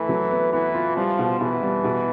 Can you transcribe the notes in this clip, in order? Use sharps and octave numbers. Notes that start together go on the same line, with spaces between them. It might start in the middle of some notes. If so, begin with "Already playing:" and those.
Already playing: E3 A3
F#3
B3
E3 B3
F4
F3 G3
B2
B2 E3
G3
B2